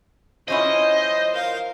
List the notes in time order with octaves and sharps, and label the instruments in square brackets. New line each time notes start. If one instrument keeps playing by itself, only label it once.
[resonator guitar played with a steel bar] F3 C#4 E4 [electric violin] C5 [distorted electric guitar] D#5
[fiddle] A#4 F5